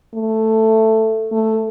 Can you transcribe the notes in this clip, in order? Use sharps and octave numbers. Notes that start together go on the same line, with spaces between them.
A3
A3